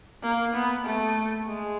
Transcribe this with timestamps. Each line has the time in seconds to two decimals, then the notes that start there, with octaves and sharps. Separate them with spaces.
0.23 A#3
0.54 B3
0.85 A3
1.47 G#3